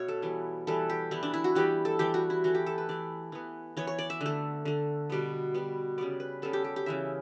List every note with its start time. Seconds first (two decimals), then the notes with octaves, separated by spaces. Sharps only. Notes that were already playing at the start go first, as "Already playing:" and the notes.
Already playing: B2 A3 C#5 E5
0.08 A4
0.22 E3 G3 B3
0.67 E3 G3 B3 A4
0.90 G4
1.11 E3 G3 B3 E4
1.23 D4
1.34 E4
1.44 F#4
1.55 E3 G3 B3 G4
1.85 A4
1.99 E3 G3 B3 G4
2.14 F#4
2.30 E4
2.44 E3 A3 F#4
2.55 G4
2.66 A4
2.78 B4
2.89 E3 A3 D5
3.32 E3 B3
3.77 E3 B3 C#5
3.87 C#5
3.99 D5
4.10 E5
4.21 D3
4.26 A3
4.65 D3 A3
5.10 B2 G3 B3
5.54 B2 G3 B3
5.98 C#3 G3 B3 D5
6.20 B4
6.42 C#3 G3 B3 A4
6.53 G4
6.64 G4
6.76 G4
6.86 C#3 E3 G3 E5